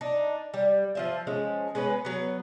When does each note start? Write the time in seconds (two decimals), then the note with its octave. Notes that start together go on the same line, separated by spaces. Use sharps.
0.01 D4 D#4
0.54 G3
0.95 F3 F4 E5
1.27 F3 G#3 C#4
1.75 G#3 B3 C#4 B4
2.05 F#3 B3